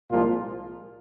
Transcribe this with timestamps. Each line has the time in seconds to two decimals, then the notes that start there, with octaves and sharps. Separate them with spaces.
0.11 C2 A#2 F3 G#3 F4